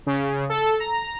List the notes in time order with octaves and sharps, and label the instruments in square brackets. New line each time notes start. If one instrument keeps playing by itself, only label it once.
[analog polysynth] C#3
A4
A#5